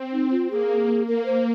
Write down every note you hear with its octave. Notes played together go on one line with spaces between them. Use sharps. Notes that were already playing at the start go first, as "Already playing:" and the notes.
Already playing: C4
D#4
F4
A#3 G#4
A#3 A#4
C5